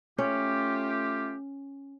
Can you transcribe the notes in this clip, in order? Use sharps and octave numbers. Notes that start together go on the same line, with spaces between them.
A3 C#4 F4 G4